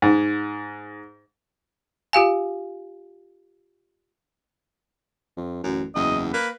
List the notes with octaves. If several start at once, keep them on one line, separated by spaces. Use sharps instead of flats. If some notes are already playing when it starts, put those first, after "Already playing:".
G#2
F4 G4 F5 G#5
F2
A1 F#2
F#1 E2 D#5
A#3 B4